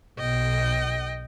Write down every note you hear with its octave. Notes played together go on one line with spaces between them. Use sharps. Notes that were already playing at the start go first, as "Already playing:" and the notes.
B1 D#5 G5